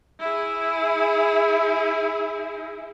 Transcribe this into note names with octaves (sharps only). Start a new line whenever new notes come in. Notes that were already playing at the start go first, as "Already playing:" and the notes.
E4 G#4